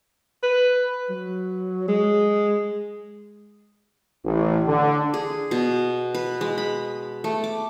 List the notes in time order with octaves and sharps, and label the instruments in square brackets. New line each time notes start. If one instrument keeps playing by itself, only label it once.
[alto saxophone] B4
F#3
G#3
[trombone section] A1
D3
[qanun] G#4
B2
B4
G#3
B5
A3
D6